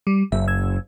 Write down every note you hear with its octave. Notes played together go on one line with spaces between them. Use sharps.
G3
F#1 E5
E6 G#6